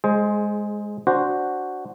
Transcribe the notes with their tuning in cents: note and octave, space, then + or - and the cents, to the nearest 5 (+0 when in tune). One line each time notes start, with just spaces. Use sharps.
G#3 +0 G#4 +25 C5 +5
D4 +0 F#4 +0 C5 +0